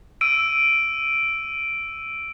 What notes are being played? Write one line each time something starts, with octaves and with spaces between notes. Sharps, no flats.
E6 D7 D#7